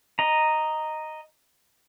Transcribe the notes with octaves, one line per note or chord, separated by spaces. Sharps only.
D#5 A#5